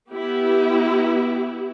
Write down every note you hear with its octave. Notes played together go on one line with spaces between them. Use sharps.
B3 E4 G4